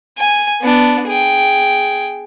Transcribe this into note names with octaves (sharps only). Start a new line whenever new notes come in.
G#5
B3 D4
G#4 G5